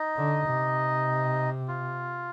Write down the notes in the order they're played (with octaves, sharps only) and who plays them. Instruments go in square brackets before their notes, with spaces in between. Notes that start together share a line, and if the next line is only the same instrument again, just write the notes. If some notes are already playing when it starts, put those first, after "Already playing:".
Already playing: [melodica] D#4 D#5
[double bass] D3
C3
[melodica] F4